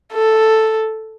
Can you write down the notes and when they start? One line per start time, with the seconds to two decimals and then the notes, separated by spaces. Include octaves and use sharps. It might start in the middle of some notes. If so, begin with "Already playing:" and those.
0.13 A4